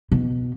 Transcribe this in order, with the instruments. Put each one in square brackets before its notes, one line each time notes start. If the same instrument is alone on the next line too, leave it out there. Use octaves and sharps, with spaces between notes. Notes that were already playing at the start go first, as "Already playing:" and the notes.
[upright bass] B2